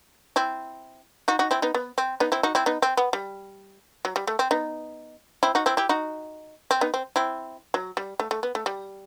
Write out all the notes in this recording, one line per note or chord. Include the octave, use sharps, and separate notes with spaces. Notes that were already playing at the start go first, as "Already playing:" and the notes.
C4 E4
D#4 F#4
D#4 F#4
C4 E4
B3 D#4
B3
C4
B3 D#4
C4 E4
D#4 F#4
C4 E4
B3 D#4
C4
B3
G3
F#3
G3
A3
C4
B3 D#4
C4 E4
D#4 F#4
C4 E4
E4 G4
D#4 F#4
C4
B3 D#4
C4
C4 E4
F#3
G3
A3
A3
B3
A3
G3